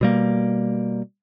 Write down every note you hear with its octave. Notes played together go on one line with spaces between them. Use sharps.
B2 G3 A#3